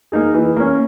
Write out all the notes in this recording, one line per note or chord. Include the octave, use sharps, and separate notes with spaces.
A#3 D#4 G#4
E3
A#3 C#4